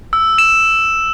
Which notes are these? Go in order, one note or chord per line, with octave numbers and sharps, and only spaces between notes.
E6
E7